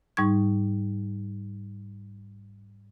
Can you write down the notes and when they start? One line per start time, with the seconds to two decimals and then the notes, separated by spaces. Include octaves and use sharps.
0.17 G#2 G3 D#4 C#6 G#6